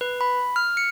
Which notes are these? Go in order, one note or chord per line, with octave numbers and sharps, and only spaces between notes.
B4
B5
F6
C#7